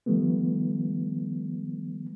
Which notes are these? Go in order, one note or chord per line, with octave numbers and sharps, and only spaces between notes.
D#3 F3 G3 A3 B3